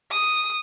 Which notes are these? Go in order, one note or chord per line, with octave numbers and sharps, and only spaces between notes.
D#6